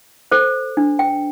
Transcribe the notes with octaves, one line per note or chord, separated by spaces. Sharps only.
A4 C5
D4
G5